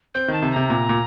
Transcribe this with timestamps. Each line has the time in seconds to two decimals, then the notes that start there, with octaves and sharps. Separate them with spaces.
0.14 C4 G6
0.28 D#3 A5
0.42 C3
0.51 A#5
0.56 C3
0.70 A#2
0.89 A#2